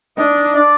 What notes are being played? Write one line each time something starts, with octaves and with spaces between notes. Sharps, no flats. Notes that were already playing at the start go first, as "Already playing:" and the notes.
D4 D#4 D#5
D4 D5